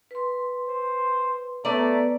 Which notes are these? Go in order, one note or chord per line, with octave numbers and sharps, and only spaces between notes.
B4 C6
C5
A3 B3 B4 D5 A#5